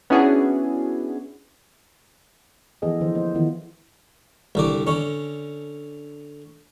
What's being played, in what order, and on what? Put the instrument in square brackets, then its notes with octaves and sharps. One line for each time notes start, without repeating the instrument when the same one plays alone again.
[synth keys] B3 C#4 D4 E4 F#4 G#4
[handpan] E3 F3 B3 G#4 A4 D#5
D3 E3 F3 C5
A#3 C5 D#5
D#3 E3 B3 E4 F4
[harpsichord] C2 D3 D5
D3 C#4